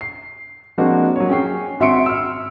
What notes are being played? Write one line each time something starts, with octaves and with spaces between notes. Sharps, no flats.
C7
F3 G#3 A#3 C4 D4 F#4
F#3 C#5
C#4 G#4 G5 C7
G#1 F#4 E5 C6 C#7 D7
E6 F6